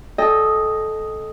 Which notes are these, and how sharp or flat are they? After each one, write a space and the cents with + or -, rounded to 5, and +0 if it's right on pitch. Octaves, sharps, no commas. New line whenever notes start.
A4 -15 D#5 +0 G5 +35